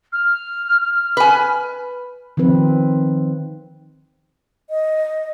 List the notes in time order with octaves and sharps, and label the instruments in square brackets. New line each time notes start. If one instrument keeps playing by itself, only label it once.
[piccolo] F6
[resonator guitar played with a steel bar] B4 G#5
[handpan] D#3 F3 C4 B4
[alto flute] D#5